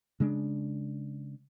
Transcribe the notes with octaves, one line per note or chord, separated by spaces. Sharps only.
C#3 G#3 D4